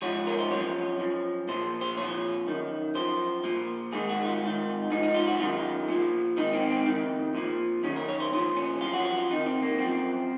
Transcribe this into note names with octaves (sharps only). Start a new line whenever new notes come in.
G#2 F3 C#5
A#4
C5
F#2 F3 C#5
F#2 F3
A#2 F3 C5
C5
A#2 F3 C#5
F#2 D#3
F#2 F3 C5
A#2 F3
G#2 D#3 G#4
F#4
F4
G#2 D#3
G#2 F3 D#4
D#4
F4
F#4
F#2 D#3 F4
A#2 F3
G#2 D#3 D#4
C4
C4
F2 D#3
A#2 F3
F#2 D#3 C#4
A#4
C#5
C5
A#2 F3 C5
C#4
F#2 F3 F4
F#4
F#4
F4
F2 D#3 D#4
C4
A#3
F#2 F3 C4